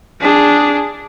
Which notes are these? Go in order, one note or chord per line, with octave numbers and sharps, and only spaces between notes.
D4 G#4